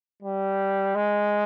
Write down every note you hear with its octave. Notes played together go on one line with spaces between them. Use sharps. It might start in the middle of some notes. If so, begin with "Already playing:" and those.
G3
G#3